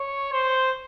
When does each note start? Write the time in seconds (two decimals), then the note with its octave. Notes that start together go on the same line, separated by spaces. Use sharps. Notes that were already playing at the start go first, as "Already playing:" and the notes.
Already playing: C#5
0.32 C5